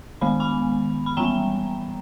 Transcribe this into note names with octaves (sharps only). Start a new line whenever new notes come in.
D#3 G#3 B3 B5
G#5 B5
B5
E3 G3 B3 G5 A#5